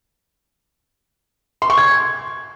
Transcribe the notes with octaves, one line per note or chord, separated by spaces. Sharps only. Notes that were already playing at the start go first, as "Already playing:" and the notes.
C6
C#6
G#6